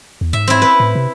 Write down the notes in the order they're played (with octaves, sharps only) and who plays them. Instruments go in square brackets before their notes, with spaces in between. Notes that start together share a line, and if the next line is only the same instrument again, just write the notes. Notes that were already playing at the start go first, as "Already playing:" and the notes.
[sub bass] E2
[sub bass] G#2 [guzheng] E5
[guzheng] C4 E4
B4
[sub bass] A2
C3